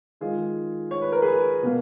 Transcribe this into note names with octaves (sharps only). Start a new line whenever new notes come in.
D#3 G#3 F4 G#4
C#5
B4
A#4
G#4 B4
B2 A#3